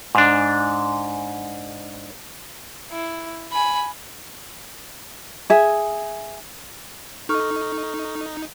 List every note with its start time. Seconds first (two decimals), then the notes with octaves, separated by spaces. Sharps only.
0.15 G#2 D4
2.91 E4
3.52 G#5 B5
5.50 G#4 E5
7.29 D#4 A4 C#6 F6